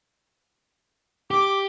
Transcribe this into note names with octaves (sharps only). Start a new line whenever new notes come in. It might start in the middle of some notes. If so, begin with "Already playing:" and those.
G4 D6